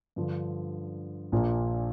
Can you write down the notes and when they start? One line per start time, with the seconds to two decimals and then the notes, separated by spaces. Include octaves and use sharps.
0.16 G2 D3 F3
1.32 A#1 A#2 F3 A#3 D4